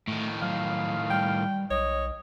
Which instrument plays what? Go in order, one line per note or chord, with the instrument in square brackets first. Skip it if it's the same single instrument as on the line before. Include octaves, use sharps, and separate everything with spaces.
[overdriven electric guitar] A2 D#3 [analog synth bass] A3
[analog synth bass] F#3 [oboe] F5
[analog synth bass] G3 [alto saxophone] G5
[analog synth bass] B1 [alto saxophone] C#5 [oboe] D#5